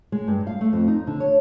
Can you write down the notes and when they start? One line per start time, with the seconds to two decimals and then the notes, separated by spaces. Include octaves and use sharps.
0.12 G#3
0.28 G2
0.47 F5
0.61 A3
0.73 F2
0.88 D#4
1.07 D3
1.20 C#5